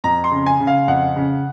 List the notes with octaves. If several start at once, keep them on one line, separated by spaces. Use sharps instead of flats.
F2 A#5
C6
C#3
G#5
C#3
F5
F2 F#5
C#3